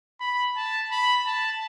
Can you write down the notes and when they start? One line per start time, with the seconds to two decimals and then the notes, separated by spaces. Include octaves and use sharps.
0.21 B5
0.56 A5
0.91 B5
1.26 A5